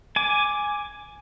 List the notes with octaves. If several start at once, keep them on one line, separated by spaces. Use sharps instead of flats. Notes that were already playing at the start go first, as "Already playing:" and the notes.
G#5 D6